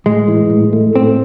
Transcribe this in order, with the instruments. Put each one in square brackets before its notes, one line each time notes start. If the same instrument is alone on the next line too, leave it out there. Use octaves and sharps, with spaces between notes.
[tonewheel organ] A2 [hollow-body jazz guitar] G#3
[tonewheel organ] E3
A2
A3
[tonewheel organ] A2 [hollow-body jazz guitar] C4